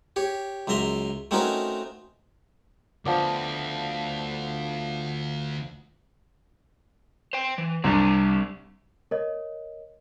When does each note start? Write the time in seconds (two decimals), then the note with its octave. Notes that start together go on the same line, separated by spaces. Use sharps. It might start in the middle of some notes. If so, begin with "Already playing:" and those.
0.16 G4 C#5
0.67 C#2 F#2 E5 A#5 C6
1.31 A3 C4 C#4 D#4 F#4 A#4
3.05 D2 F3 B3 D5
7.33 C5 G5
7.58 E3
7.84 C2 G3 C4 D4
9.11 A#4 C#5 D#5